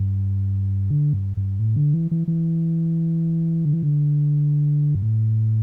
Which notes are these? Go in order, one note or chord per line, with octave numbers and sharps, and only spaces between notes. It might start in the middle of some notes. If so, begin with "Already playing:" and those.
Already playing: G2
D3
G2
G2
A2
D3
E3
E3
E3
D3
E3
D3
G2
A2